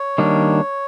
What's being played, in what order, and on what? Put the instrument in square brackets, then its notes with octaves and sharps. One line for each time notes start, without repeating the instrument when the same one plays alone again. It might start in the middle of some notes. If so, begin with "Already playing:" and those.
Already playing: [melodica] C#5
[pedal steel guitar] D#3 G3 A#3 D4